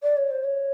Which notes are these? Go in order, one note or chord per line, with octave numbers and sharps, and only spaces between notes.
D5
C#5
C5
C#5